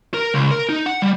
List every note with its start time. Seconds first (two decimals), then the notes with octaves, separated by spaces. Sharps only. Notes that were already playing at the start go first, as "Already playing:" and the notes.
0.14 A#4
0.34 C#2
0.51 A#4
0.69 D#4
0.86 F#5
1.02 G3